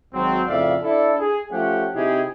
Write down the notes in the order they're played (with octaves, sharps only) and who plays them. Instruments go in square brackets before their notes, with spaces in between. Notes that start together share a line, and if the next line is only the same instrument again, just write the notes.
[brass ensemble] G#1 G#2 F#3 C4
F2 A2 C#3 D5 E5 F5
D4 E4 A4
G#4
F3 A3 C#4 G4 F#5
C3 D#4 E4 G4 G#4